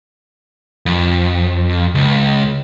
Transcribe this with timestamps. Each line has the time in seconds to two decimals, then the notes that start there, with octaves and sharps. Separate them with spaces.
0.86 F2
1.95 C#2